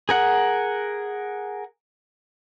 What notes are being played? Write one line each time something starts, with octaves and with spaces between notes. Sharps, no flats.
G#4 A#4 F#5